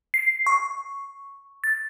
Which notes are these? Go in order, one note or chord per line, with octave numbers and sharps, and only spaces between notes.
C7
C#6
A6